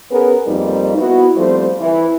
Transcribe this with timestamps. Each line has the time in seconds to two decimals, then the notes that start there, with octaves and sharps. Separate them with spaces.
0.11 B3 C#4 G#4 A#4 B4
0.46 F2 G3 A#3 C4 D#4
0.97 B3 E4 F#4
1.36 F3 G3 A3 C4 F4 C5
1.81 E3